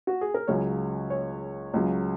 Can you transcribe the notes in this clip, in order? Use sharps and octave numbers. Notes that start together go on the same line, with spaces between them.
F#4
G#4
A#4
C#2 C#3 F#3 C#5
C#5
C#2 C#3 F#3